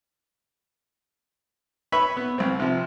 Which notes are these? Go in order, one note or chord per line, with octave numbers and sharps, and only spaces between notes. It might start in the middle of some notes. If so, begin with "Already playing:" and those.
B4 C#5 E5 B5
B3
C2 C4
C3 F3